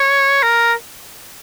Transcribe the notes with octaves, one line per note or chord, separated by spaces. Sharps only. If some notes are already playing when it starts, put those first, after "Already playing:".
Already playing: C#5
A#4